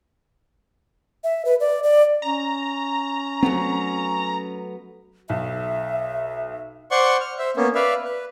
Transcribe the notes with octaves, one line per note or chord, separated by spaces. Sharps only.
E5
B4
D5
D5
C#4 A#5
F#3 A3 B3 C4
B1 E5
C5 D5 F#5 C6 C#6
F6
C5 E5
A#3 B3 C#4
B4 D5 E5 F5
B4